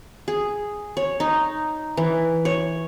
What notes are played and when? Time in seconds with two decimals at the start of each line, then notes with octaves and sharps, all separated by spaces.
0.28 G#4
0.97 C#5
1.20 D#4
1.97 E3
2.45 C#5